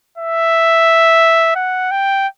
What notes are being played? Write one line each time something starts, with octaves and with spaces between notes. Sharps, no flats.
E5
F#5
G5